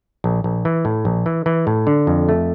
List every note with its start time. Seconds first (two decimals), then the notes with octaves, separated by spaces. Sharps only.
0.24 A#1
0.44 A#1
0.65 E3
0.85 A2
1.05 A#1
1.26 E3
1.46 E3
1.67 A2
1.87 D3
2.07 F2
2.29 A3